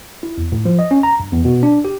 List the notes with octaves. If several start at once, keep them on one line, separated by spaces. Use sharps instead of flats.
E4
E2
A2
F3
D#5
C#4
A#5
G2
E2
B2
D4
G4